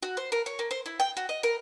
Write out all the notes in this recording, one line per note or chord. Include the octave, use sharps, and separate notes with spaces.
F#4
C5
A#4
C#5
A#3
C5
E4
G5
F#4
D#5
A#4